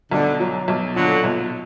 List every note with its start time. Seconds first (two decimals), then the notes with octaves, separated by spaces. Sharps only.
0.11 B1 D3
0.40 F#3
0.68 B1
0.95 A#2 D3 F#3
1.24 B1